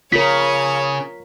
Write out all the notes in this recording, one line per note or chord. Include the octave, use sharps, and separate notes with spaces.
C#3 F4 A#4 C#5 B6